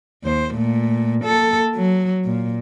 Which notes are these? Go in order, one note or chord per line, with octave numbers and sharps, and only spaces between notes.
D#2 C5
A#2 A3
A#3 A4
F#3
A#2